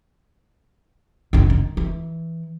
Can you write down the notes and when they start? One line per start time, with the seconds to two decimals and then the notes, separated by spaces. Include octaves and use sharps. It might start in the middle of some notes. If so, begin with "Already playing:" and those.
1.33 F#2 D3
1.50 D#3
1.77 E3